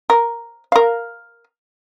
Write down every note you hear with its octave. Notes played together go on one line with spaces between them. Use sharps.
A#4
A#4 F5